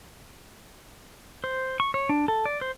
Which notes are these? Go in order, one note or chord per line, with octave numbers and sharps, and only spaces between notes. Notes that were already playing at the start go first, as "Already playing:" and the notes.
C5
C#6
C#5
D4
A4
D5
C5